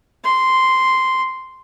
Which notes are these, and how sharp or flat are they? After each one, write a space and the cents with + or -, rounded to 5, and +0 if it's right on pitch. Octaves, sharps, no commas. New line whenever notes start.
C6 -5